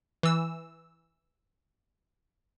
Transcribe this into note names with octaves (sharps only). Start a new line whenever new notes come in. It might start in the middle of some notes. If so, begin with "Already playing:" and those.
E3 E6